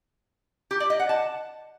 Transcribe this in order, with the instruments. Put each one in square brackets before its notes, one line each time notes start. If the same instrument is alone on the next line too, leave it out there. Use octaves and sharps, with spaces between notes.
[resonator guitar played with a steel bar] G4
D5
D#5
F#5
A5